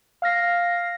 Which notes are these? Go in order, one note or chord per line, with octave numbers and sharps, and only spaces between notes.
F5 F6 A#6 C7